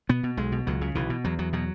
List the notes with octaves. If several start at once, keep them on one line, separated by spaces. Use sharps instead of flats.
B2 B3
B2
B1 G#3
B2
C#2 F#3
C#3
B1 E3
B2
E2 F#3
E2 F#3
B2 F#3